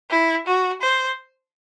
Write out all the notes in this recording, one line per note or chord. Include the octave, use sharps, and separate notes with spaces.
E4
F#4
C5